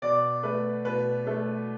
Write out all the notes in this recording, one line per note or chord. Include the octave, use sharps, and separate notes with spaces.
B2 D5
A3 B4
B2 B4
A3